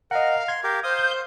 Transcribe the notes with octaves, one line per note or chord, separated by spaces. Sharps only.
A#4 D#5 F5 F#5
C6 G#6
G4 A#4 F5 G6
C5 F5 D#6 G6